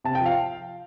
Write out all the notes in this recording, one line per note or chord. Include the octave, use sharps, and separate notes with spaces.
C3 A5
G5
F3
F5